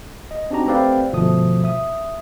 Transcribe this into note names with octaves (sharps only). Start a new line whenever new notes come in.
D#5
C4 D4 D#4 F#4 G4 A#5
A3 C4 G4 B4 D5 F5
G1 B2 F3 A3 D#6
E5 D#6